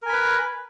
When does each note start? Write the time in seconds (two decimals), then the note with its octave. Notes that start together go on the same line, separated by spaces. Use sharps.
0.02 A#4
0.06 G#5
0.09 B5
0.13 B4